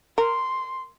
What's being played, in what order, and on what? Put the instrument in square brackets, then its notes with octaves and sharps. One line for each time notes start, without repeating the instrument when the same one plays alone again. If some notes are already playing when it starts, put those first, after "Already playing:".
[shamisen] A#4 [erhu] C6